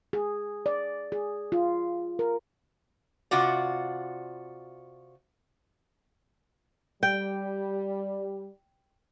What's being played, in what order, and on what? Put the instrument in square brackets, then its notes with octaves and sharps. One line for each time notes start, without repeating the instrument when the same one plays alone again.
[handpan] G#4
D5
G#4
F4
A#4
[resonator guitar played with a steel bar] C3 F4 F#4 D5
[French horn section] G3 [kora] G5